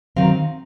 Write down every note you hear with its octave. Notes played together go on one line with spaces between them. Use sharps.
D#3 F#3 C4 F5